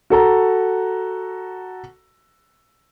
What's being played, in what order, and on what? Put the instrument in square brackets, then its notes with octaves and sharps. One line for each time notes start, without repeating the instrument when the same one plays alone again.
[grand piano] F#4 A4 A#5